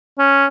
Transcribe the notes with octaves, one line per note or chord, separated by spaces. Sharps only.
C#4